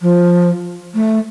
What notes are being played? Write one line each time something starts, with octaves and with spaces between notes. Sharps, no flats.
F3
A3